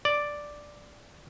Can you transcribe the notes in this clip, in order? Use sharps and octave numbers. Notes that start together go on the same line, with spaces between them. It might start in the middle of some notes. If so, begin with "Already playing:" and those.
D5